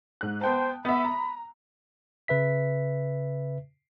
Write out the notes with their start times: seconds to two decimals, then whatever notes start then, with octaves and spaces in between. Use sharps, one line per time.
0.21 G#2 F#6
0.41 B3 C5 G5 A5
0.85 B3 E5 B5
1.05 A#5
2.28 C#3 B4 E5 B6